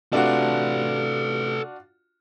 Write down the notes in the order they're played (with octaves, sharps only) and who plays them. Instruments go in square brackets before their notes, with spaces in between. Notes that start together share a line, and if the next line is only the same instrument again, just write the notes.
[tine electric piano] C3 A3 [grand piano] D4 F4 F#4 [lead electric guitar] A4 B4